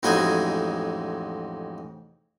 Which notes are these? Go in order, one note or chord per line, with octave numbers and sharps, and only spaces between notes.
A1 F2 G#3 D#4 F#4 G#5